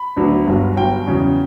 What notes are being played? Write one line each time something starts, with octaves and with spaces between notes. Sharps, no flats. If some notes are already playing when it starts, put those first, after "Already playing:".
Already playing: B5
D2 D3 F#3 B3 D4
G1 G2 F#3
G1 G2 F#3 G5
E2 C#3 F#3 C#4